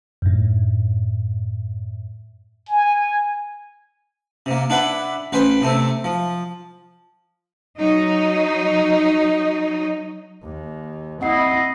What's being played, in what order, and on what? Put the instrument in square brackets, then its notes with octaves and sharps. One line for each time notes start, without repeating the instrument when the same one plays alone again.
[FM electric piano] F#2 A2
[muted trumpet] G#5
[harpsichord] C3 A#3
D4 E4 B4 F#5
A1 B4 C5 G5
C3 A3 C4
F3
[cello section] F#3 D#4
[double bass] D#2
[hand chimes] C4 F#5 C7 [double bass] E4 [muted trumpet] D#5